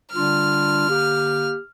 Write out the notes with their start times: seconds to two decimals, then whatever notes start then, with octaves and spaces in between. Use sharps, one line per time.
0.12 D3 G3 D4 F4 F6
0.86 D3 A#3 G4